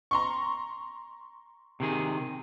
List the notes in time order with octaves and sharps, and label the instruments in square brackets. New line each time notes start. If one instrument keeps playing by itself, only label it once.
[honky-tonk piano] A#5 C6 C#6
[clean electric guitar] C3 D#3 G#4